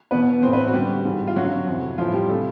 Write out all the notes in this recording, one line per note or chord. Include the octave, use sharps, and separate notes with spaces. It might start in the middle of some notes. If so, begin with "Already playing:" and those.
E2 B2 B3 B4
A2 E3 C4 C5
B3 B4
F#4
F#2 D3 G3 G4
G#2 E3
F4
F#2 D3 F#3 F#4
F2 C3 E3
A2 E3 F3 F4
G3 G4
C3 E3 A3 A4